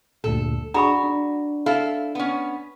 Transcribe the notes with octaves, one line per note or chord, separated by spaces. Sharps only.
D2 G2 A#2 A4
D4 F#4 G#4 A#5 B5 C#6
D4
E4 A4 F5
B3 C#4